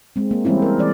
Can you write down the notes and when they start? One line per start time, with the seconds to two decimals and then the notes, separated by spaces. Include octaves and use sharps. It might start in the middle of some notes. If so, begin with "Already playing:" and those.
0.16 G#3 C4
0.31 A#3
0.45 E3 G3 G#3 C4 C#4 E4
0.62 A#4
0.79 E3 G#4 D5